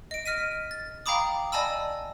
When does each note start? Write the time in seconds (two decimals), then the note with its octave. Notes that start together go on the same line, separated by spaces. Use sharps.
0.11 D#5 D7
0.25 D#5 F6 B6 D#7
0.71 A6
1.06 F5 G5 A#5 B5 D6 D#6
1.52 D5 D#5 G#5 A5 B5 E6